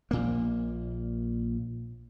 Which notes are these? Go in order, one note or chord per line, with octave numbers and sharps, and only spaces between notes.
A#1 A#2 A#3